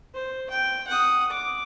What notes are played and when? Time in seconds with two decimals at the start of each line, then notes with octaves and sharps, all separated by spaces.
0.14 C5
0.50 G5
0.88 F#5 D#6
1.30 D6